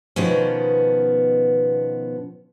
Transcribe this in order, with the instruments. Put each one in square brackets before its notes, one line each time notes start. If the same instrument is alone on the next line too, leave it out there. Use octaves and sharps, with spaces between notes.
[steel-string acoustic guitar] B2 D#3 F3 B3 C#4